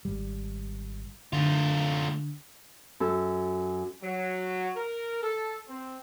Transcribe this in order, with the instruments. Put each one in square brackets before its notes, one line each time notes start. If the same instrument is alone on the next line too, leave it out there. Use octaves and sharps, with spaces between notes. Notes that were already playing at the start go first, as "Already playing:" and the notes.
[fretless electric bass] G#1 G3
[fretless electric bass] D3 [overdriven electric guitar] A3 F4
[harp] F#2 A4
[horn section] F#3
A#4
A4
C4